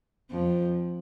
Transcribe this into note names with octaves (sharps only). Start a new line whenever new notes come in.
F2 F3